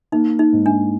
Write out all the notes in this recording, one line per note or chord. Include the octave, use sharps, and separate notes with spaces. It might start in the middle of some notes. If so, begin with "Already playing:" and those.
A#3 D#4
D#4
G#2
D4